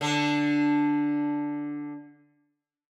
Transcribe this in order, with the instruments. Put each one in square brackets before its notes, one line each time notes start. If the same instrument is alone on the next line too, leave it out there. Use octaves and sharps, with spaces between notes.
[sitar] D3 D4